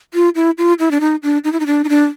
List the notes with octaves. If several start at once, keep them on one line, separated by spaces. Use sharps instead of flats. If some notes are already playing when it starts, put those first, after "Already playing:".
F4
E4
F4
E4
D4
D#4
D4
D#4
E4
D#4
D4
D#4
D4